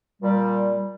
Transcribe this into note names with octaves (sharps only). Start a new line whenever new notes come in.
A#2 G3